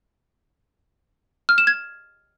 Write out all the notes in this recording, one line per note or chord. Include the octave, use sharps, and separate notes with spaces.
F6
E7
G#6